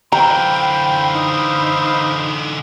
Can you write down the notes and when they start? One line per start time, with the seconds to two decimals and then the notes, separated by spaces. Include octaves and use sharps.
0.12 D3 E3 C5 F5 G5 A#5 B5
1.14 D#4